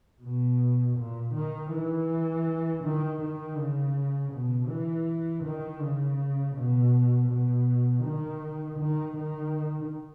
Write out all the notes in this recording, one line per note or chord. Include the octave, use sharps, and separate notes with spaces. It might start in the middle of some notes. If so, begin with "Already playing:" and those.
B2
A#2
D#3
E3
D#3
D#3
C#3
B2
E3
D#3
C#3
B2
B2
D#3
D#3
D#3